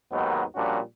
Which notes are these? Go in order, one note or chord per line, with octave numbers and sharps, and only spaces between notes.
D#2 G#2 D#3 F#3 B3 D#4
A#2 F3 G3 C#4 D4 F#4